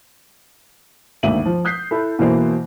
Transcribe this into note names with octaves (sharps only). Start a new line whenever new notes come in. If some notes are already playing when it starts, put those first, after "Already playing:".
G#1 D2 A#3 E5 D#7 F#7
F3
D#6 F#6 G6 B6 C7
E4 A4 B5
B2 E3 A#3 C5